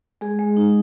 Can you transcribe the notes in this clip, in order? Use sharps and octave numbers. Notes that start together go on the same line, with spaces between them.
G#3 G#4
G#3
D#4